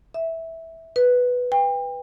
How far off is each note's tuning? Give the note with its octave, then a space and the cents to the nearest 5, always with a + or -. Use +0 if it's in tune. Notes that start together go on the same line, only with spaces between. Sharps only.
E5 -10
B4 +0
G5 +35